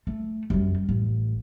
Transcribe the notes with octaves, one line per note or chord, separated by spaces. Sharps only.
A3
F#2 G3
A1